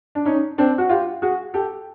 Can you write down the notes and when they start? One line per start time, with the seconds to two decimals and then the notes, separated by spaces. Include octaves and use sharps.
0.15 D4
0.25 C#4 D#4
0.58 C4 D4
0.78 F#4
0.89 F4 G4
1.22 F#4 G#4
1.54 G4 A4